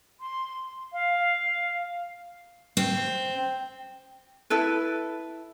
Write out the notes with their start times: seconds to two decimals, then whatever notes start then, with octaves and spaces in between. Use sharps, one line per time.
0.20 C6
0.92 F5
2.77 C4
4.50 E4 A4 B4